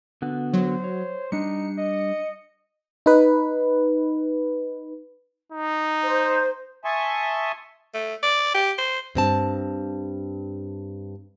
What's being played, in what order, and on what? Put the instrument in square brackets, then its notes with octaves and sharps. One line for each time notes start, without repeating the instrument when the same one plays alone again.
[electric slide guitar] D3 B3 F#4
[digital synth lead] F#3 [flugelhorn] C5
[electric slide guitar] C#5
[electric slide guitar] G3 D4 [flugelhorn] D#4 [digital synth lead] C#7
[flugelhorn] D#5
[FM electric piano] D#4 B4
[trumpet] D#4
[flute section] C5
[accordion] E5 G#5 A5 C6 C#6 D#6
[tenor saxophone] A3
D5
G4
C5
[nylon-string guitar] G2 C4 A5